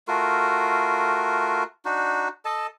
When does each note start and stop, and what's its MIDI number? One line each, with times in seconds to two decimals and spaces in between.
0.08 1.64 57
0.08 1.64 65
0.08 1.64 66
0.08 1.64 70
1.85 2.28 62
1.85 2.28 63
1.85 2.28 66
2.45 2.67 69
2.45 2.67 75
2.45 2.67 81